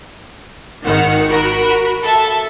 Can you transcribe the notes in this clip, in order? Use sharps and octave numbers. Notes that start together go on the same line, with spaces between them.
G#1 D#3 F#5
F#4 A#4 B5
A4 E5 A5 E6